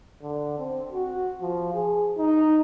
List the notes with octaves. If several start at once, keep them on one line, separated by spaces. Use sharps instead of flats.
D3
C4
F#4
F3
G#4
D#4